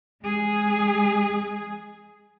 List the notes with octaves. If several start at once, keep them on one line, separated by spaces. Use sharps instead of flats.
G#3 G#4